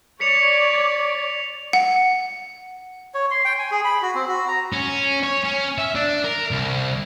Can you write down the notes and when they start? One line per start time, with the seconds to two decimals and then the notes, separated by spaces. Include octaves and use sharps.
0.20 C#5 D5 B6 C#7 F7
1.73 F#5
3.14 C#5
3.31 C6
3.45 G5
3.59 G#5
3.71 G#4
3.84 B5
4.02 F#4
4.15 C4
4.28 F#4
4.48 A#5
4.73 C#4
5.23 C#5
5.44 C#4
5.78 E5
5.95 D4
6.24 A#4
6.51 C2